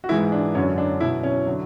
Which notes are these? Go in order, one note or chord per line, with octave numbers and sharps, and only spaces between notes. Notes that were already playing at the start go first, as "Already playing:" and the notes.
F#4
G#2 E3 G#3 E4
D4
F#2 D3 F#3 C#4
D4
B2 F#3 E4
C#4
D3 F#3